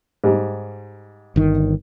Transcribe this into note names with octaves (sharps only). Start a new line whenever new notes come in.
G#2 G3
G1 D#3